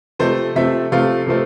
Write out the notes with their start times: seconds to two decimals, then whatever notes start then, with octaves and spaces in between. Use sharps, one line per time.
0.19 C3 F3 A3 C4 C5
0.55 C3 F3 A3 C4 E5
0.92 C3 F3 A3 C4 F5
1.27 C3 F3 A3 C4